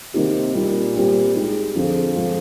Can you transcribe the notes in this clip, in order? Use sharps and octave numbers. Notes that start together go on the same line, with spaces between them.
C3 D#3 A#3 D#4 G4
A#2 G3 A#3 D#4
G3 C4 G4
G#3 D#4 G4
F2 D3 F3 C4 F4 G#4
F3 G#3 C4 F4